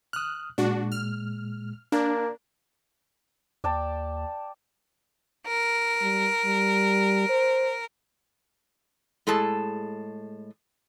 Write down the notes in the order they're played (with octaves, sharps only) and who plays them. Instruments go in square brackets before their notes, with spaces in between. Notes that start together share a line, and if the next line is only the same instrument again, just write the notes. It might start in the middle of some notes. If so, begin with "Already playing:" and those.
[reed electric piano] D#6 F6 [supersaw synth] F#6
[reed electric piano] A#2 G#3 [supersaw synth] D4 F#4
[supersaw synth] F6
[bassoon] A#3 [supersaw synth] D4 [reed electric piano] A#4
[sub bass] D#2 [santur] D5 G5 A5
[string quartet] A#4
[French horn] G3
G3
C5
[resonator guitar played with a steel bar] A2 G#3 G#4 A4 A5